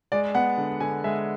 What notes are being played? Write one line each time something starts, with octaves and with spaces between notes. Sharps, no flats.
G#3 D5
B3 F#5
D3
D3 G#5
G#3 E5